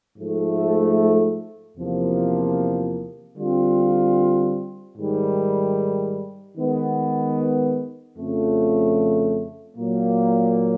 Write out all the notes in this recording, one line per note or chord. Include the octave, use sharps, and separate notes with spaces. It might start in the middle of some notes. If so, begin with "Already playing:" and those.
G#2 F3 A3
E2 C3 F3 A#3
D3 G3 C4 F4
G#2 D#3 G3
D#3 G#3 B3
F2 C#3 F3 A3
A#2 F#3 A#3